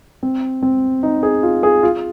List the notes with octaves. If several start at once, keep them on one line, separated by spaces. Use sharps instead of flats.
C4
C4
D#4
G#4
F4
G#4
F4